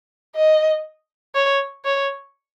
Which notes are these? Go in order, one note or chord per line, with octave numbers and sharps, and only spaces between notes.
D#5
C#5
C#5